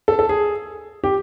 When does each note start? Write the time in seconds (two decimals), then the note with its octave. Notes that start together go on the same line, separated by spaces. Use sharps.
0.08 A4
0.19 A4
0.29 G#4
1.04 G4